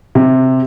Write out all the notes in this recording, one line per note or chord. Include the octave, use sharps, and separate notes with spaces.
C3